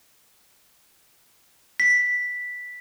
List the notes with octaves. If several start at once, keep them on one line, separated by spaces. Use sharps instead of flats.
B6